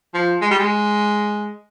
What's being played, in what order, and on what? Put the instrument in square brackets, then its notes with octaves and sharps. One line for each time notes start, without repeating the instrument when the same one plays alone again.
[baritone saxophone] F3
G#3
G3
G#3